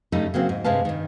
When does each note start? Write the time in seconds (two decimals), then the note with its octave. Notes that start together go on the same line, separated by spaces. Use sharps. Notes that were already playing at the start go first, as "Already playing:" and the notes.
0.12 G2 C#3 G3 A3 D#4 A4
0.34 C#3 F#3 A#3 C4 F#4
0.49 G#2
0.64 G2 C3 G#3 B4 F5 A5
0.85 G2 D#3